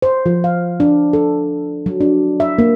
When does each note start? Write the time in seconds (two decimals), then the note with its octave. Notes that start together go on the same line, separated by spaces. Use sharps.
0.02 C5
0.26 F3
0.44 F5
0.80 D4
1.13 A4
1.86 F#3
2.01 D4
2.40 E5
2.59 A#3